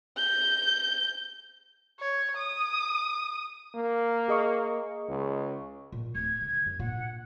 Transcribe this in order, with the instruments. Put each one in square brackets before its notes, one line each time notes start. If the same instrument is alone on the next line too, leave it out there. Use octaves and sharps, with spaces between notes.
[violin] G6
[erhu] C#5
D#6
[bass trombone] A#3
[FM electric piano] G#4 D#5 C#6
[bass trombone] C#2
[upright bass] A#2
[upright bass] D1 [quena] G#6
[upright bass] D3
F#2
[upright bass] A#2 D4 [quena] F#5